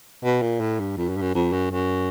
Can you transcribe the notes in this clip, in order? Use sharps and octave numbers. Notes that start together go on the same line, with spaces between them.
B2
A#2
A2
G2
F2
F#2
G2
F#2
F2
F#2
F#2